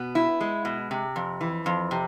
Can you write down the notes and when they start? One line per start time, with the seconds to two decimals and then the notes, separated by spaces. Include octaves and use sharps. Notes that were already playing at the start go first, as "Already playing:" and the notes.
Already playing: B2 B3
0.15 E4
0.41 G#3
0.65 B2
0.91 C3
1.16 F2
1.41 E3
1.66 F2
1.91 C3